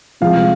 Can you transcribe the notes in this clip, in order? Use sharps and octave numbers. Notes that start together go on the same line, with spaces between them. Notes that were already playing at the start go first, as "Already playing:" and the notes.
C3 F3 G#3 F5